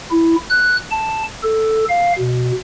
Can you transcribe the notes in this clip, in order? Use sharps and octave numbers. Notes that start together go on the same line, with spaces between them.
E4
F#6
A5
A4
F5
B2